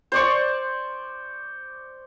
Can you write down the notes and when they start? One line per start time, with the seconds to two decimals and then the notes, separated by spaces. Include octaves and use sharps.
0.12 C5 D5 C#6